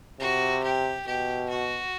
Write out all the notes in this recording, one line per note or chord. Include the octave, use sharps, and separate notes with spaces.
C3 F#4
G4
B2 G4
F#4